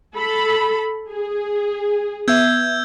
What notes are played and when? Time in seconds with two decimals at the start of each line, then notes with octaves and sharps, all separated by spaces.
0.13 A4 B5
1.09 G#4
2.28 B3 E5 E6 G6 G#6